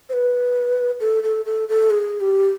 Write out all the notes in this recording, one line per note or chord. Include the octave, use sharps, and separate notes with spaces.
C5
B4
A4
A4
A4
A4
G#4
G4